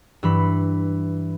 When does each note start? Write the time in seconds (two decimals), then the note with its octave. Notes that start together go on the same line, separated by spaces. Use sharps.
0.23 G2 E3 B5